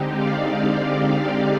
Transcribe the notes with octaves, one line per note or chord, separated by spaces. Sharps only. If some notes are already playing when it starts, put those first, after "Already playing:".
Already playing: D3 G#3 C4 D#4 G4
D5 F5